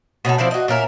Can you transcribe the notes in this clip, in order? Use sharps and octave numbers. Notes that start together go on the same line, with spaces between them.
B2 C#4 D#4 A4
F3 C4 E4 D5
F#4 D#5
A#2 C#4 A#4 E5